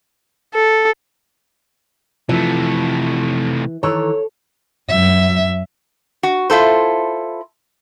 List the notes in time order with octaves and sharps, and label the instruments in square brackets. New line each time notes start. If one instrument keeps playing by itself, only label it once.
[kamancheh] A4
[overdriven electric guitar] C3 A3 [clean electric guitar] E3 [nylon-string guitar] F3
[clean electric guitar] D#3 E3 [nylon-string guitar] A4 C#5
[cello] F#2 E5
[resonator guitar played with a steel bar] F#4
E4 F4 A4 C5